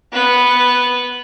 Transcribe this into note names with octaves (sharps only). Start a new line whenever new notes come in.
B3 B4